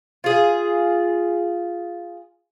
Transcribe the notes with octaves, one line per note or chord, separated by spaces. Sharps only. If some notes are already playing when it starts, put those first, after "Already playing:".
F4 G#4